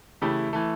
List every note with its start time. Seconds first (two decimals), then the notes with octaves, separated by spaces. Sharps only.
0.21 C#3 E3 A3 E4 G4
0.53 E3 A3